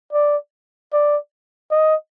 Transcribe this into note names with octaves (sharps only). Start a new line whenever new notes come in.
D5
D5
D#5